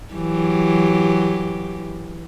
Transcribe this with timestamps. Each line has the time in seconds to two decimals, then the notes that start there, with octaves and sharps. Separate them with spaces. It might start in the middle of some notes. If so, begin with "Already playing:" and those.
0.14 E3 F#3 G4